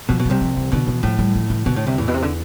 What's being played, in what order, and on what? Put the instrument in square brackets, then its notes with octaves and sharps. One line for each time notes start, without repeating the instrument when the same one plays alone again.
[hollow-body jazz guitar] B2 [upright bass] F3
[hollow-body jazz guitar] B2
[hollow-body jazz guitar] C2 C3 [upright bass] G3
[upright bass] F3
E3
[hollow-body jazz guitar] B2 [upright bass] D3
[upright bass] E3
[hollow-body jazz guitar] A2 [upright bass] F3
[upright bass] G3
F3
E3
[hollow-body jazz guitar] B2 [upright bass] D3
[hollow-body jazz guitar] A2
C2 C3
[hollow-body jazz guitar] E2 E3 [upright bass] A2
[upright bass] B2
C3
D3